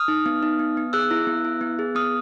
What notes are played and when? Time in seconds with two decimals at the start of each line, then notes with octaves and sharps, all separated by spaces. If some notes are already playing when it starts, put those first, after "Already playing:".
Already playing: D#6 F6
0.08 D#4
0.26 B3
0.43 D#4
0.59 B3
0.77 B3
0.93 G#4 E6 F#6
1.11 E4
1.27 B3
1.45 E4
1.61 B3
1.79 G#4
1.95 B3 D#6 F6